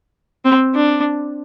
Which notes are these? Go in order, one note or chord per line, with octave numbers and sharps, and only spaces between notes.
C4
D4